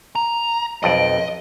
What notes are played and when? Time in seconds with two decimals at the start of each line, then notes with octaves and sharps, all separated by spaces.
0.15 A#5
0.83 B1 F2 D5 D#5